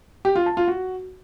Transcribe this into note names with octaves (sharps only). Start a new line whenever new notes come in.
G4
F4
A5
F4
F#4